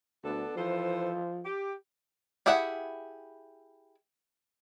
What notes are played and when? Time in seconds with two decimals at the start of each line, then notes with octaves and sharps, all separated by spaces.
0.24 D2 B3 D4 A4
0.56 E3 F3 A4 C5
1.45 G4
2.46 E4 G4 G#4 E5 F#5